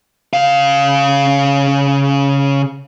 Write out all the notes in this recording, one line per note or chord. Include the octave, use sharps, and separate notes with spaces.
C#3 F5